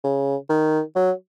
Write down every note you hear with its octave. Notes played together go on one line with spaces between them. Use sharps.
C#3
D#3
F#3